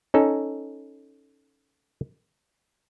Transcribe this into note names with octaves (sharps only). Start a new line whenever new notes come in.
C#4 D#4 A4